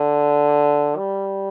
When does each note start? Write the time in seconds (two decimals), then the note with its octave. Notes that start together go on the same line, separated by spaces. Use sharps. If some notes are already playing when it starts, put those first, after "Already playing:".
Already playing: D3
0.97 G3